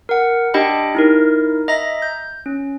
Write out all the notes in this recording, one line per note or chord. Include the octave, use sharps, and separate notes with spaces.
A#4 F#5
D4 G4 D#5 G5 B5
D#4 E4 A#4
D#5 E5 A#5 A#6
G6
C#4